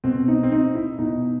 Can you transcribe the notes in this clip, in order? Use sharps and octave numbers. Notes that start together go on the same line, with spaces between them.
B2 C4
D#4
C4
D#4
E4
B2 D#4